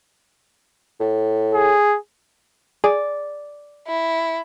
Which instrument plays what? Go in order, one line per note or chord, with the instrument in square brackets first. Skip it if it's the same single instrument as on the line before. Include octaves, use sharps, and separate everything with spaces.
[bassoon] A2
[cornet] G#4
[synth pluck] G#4 [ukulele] D5
[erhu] E4